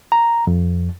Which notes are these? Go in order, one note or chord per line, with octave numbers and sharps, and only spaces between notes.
A#5
F2